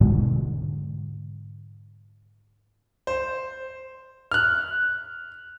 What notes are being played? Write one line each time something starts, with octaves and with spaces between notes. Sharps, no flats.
G#2 B2 D3 G#3
C5
F6 F#6